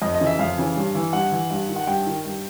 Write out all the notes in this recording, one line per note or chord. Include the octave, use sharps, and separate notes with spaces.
F2 D#5
D#5
C#3 E3
E5
F2 F5
C#3 E3
G2
E3
G2 F#5
E3
G2
D#3
F#5
G2 G5
D#3
G2